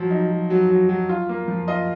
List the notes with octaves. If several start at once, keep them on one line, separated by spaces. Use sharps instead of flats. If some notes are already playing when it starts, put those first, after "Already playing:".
Already playing: F3 F#3
D#4
F#3
F#3
F#3
F#3
F4
A#3
F3
F4 D#5